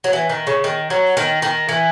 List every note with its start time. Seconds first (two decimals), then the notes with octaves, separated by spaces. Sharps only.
0.04 F#3
0.13 E3
0.30 D#3
0.47 C#3
0.64 D#3
0.90 F#3
1.17 D#3
1.42 D#3
1.69 E3